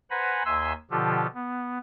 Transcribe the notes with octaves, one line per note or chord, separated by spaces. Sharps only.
B4 C5 F#5 G#5 A#5 B5
D#2 E5 G#5 C6 E6
B2 D3 F3 F4 G4 A4
B3